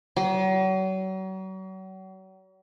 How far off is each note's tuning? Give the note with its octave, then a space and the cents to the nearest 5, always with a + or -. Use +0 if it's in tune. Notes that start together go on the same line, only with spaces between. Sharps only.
F#3 +40